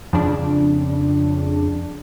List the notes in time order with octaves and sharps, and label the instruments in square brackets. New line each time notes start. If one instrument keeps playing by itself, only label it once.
[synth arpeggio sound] F2 C#3 D4